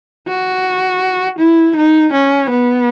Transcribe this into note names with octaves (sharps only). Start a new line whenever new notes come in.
F#4
E4
D#4
C#4
B3